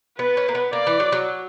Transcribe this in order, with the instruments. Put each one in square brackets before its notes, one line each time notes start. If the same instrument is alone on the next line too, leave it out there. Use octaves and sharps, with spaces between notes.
[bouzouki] B3 [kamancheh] B4
[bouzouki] C#4
A#3
B3
[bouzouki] A#3 [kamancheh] D5
[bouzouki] E3
F#3
F#3